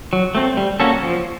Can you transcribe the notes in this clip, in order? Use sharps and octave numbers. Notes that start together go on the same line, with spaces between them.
F#3
A3 C4
G3
A#3 C#4 F#4 A4
F3